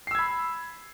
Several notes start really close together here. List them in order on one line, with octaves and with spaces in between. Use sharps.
C7 E6 G#6 B5